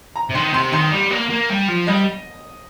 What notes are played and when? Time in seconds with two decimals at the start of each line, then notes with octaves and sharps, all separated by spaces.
0.16 A#5
0.30 C3
0.35 D#3 C6
0.54 C3 C6
0.73 D#3 C6
0.92 G3
1.11 A#3
1.30 A#3
1.50 G3
1.68 F3
1.87 G3 D#5